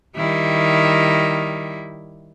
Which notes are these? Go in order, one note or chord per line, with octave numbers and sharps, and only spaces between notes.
D#3 G3 E4